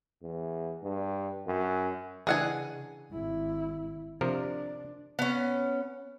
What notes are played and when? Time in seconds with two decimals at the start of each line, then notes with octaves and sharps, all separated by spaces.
0.22 E2
0.83 G2
1.47 F#2
2.27 C#3 E3 D4 G#4 F#5 G#5
3.11 G#1 E4
4.21 C3 F3 D4 A#4
5.19 B3 C#4